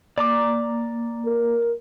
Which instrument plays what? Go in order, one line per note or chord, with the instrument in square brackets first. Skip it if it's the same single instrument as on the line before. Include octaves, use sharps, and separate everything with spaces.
[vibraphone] A#3 [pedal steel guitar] D5 A#5 D6
[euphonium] A#4